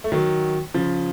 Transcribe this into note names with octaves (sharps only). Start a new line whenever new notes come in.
A3
D#3 F#3
C#3 F3